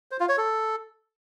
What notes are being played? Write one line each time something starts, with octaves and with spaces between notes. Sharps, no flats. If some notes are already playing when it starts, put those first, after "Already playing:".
C5
F4
C#5
A4